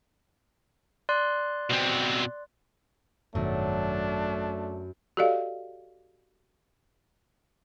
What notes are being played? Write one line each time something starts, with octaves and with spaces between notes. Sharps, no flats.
D5 C6 F#6
B2 C4
G#1 F#2 B2 D#3 A3 D4
F#4 G4 A4 D5 D#5 F5